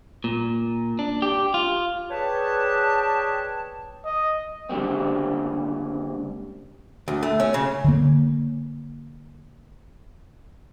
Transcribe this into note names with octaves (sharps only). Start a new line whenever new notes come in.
A#2
D4
G4
F4
G#4 B4 C#5 D5 G5 A5
D#5
C#2 D3 G3 A#3 C4
D2
A3
C#4
C#3
D3 A#3